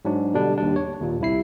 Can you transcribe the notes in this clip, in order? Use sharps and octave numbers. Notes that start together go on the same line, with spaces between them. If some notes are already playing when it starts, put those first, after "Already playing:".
G#2 F#3 D4
B2 D3 G3 D4
D#2 G3 D4
C#5
D#2 A#2
C2 C3 E4 C7